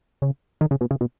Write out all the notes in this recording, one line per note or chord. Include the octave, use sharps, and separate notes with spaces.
C#3
D#3
C#3
B2
C#3
B2